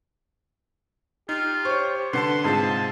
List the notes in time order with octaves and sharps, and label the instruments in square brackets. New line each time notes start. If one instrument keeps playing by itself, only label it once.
[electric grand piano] D#4 [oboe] F4 [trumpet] G4
[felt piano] C5 C#5 [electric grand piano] C#6
[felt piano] D3 [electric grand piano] B4 F#5 A5 [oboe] C6
[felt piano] G#2 [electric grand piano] C3 C4 F4 [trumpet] A5